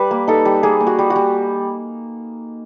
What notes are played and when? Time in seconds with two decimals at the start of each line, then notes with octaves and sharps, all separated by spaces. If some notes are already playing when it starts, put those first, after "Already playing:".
Already playing: G3 B4
0.11 A#3
0.28 D#4 A4
0.45 G3
0.63 A#3 G#4
0.80 A#3
0.87 F#4
0.99 G3
1.10 F#4
1.16 G3